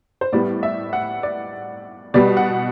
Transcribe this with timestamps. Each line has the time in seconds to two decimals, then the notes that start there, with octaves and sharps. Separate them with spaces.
0.21 C5
0.33 A2 G3 B3 D5
0.63 E5
0.93 F#5
1.23 D5
2.14 B2 G3 B3 D5
2.37 F#5